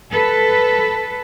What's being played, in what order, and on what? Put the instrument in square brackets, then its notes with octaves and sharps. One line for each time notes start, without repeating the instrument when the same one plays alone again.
[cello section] A4 B4